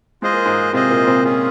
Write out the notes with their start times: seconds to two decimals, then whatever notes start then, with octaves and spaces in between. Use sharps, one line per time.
0.22 G#3 F4 G#4 C5 D#5
0.33 A#3
0.45 G#2 G#3
0.73 C3 C4 F4 G#4 C5 D#5
0.90 A#2 A#3
1.07 C3 C4
1.25 C#4 F4 G#4